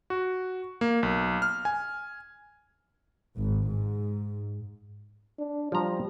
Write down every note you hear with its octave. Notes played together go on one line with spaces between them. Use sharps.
F#4
A#3
B1
F6
G#5
G#1
G#2
D4
F3 G3 A#5